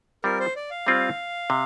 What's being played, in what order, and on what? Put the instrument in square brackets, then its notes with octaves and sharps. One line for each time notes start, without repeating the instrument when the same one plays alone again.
[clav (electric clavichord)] G3 C4 F4 [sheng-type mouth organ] A#4
[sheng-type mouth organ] C5
D5
F5
[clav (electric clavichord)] G3 C4 F4
C3